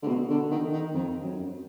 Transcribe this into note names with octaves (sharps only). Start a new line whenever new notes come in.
D3
B2
D3
D#3
D#3
F2
F#2